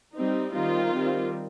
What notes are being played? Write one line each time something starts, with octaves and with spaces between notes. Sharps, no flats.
G3 C4 D#4
D#3 G3 C4 D#4 F4
D#3 G3 C4